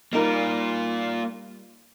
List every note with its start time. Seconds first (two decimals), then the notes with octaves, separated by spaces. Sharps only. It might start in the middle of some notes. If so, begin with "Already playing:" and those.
0.13 G3 A#3 D#4 F4 A#4